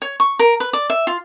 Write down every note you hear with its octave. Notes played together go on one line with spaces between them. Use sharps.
C#5
C#6
A#4
B4
D5
E5
F4